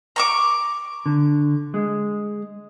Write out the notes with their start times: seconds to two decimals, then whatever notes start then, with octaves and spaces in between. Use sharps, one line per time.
0.16 A#5 C#6 D6
1.06 D3
1.74 G#3